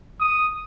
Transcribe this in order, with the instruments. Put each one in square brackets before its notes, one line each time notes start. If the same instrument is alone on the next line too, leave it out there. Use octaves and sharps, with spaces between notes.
[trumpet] D#6